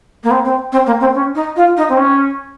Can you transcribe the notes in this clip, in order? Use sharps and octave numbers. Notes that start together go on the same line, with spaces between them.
A#3
C4
C4
C4
A#3
C4
C#4
D#4
F4
D#4
C4
C#4